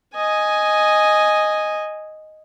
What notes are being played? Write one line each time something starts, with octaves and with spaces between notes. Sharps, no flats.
D#5 G#5